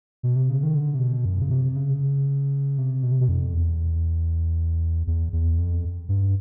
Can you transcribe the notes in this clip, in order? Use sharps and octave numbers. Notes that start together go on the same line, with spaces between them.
B2
C3
C#3
D#3
D3
C3
B2
F#2
C#3
C3
C#3
C3
B2
C3
B2
F2
E2
E2
E2
F2
G2